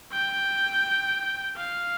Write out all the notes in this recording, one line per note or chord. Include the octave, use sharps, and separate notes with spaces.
G5
F5